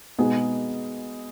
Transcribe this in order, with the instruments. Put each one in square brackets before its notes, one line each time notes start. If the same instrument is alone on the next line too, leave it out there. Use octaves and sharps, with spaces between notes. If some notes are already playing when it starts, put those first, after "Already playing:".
[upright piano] B2 G#3 B3 D#4 G#4